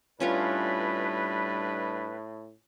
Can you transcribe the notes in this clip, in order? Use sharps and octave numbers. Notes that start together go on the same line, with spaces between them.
A2 G3 C#4 D4 F4 B4 C#5